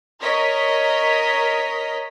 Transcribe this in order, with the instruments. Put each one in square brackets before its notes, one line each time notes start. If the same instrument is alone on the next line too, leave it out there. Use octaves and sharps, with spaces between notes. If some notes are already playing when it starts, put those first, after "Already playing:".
[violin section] A#4 C#5 D#5 B6